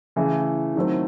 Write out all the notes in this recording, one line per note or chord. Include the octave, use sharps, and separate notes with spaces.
C#3 E3 A3
D#3 F#3 A3 C4